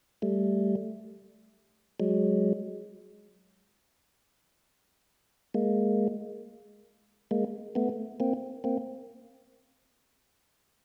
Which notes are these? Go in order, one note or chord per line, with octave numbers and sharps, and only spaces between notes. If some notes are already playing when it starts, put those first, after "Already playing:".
G3 A3
F#3 G#3
G#3 A#3
G#3 A#3
A3 B3
A#3 C4
A#3 C4